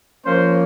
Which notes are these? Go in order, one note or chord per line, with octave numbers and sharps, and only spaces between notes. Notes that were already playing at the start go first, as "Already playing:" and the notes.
F3 A#3 C#4 C5